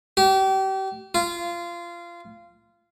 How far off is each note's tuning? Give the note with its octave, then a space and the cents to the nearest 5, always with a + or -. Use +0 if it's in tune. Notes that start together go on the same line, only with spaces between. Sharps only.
G4 -35
F4 -20